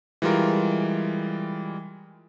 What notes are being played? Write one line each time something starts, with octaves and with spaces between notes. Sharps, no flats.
E3 G3 G#3 F4 A#4